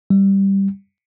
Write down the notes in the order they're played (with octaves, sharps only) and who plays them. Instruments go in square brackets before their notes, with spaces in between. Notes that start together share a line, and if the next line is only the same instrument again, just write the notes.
[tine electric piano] G3